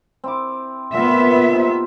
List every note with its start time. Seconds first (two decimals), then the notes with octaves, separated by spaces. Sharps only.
0.24 C4 E4 D6
0.94 A#2 B3 F4 E5 F#5
1.51 C3 C4 D#4